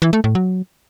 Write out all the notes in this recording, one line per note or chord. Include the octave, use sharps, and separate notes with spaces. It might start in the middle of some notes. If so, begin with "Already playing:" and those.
E3
A3
A2
F#3